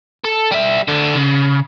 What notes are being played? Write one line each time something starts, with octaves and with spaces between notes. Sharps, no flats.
A4
G3 E5
D2 D3
C#3